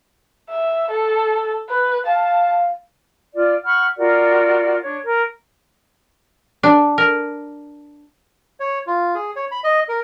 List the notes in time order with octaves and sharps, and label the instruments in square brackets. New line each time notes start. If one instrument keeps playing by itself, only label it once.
[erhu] E5
A4
B4
[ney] F5 [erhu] A5
[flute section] F4 D5
F#5 B5 C#6 F6
F4 F#4 A#4 D5
D4 C#5
A#4
[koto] D4
A#4
[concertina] C#5
F4
G#4
C#5
B5
D#5
A#4